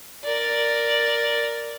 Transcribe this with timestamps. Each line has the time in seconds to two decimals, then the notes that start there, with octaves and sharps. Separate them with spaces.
0.25 A#4 D5